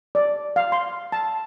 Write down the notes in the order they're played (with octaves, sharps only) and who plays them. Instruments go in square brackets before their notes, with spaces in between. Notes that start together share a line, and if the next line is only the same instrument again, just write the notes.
[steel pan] D5
F5
C6
A5